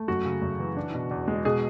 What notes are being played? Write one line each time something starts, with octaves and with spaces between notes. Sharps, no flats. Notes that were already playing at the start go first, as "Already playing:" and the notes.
Already playing: A3
F#2 F#4
C#3
F#2
E3
D4
B2
E2
G#3
B2 G#4